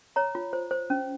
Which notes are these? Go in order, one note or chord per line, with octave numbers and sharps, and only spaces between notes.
C#5 A#5
F4
C5
C5
C#4